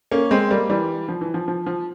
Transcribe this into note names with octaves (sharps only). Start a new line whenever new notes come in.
A#3 C#4
G#3 C4
G3 A#3
E3 G3
F3
E3
F3
F3
F3